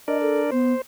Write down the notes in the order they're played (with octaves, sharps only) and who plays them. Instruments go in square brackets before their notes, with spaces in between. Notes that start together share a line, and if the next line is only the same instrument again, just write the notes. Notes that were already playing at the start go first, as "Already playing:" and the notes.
[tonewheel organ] D4 A#4 D5 [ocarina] D#5
[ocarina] A4
[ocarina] B3 [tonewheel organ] C5